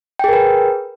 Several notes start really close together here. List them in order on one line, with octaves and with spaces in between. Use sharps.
G5 G#4 A#4 B4